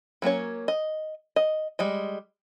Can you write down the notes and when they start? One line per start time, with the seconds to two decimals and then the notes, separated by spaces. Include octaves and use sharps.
0.22 F#3 A#3 C#4 C#5
0.68 D#5
1.36 D#5
1.79 G3 G#3 D#5